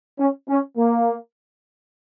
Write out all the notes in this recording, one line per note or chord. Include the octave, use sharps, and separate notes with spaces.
C#4
C#4
A#3